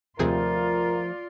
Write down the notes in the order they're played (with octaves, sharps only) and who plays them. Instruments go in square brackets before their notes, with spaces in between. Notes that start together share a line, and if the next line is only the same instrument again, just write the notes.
[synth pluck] D#2 C3 G#4 [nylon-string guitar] F3 A3 [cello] F4 D5 [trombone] A#4